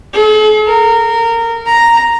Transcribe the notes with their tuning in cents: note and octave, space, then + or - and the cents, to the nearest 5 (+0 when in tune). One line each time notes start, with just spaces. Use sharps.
A4 -45
A#4 -20
A#5 +0